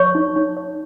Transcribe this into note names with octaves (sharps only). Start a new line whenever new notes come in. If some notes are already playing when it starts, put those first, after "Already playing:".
Already playing: C#5 C#6
D#4
D#4
C#5